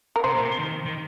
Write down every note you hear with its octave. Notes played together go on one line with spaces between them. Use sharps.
A#4
C3 C5
A#2
C3
D#3
D#3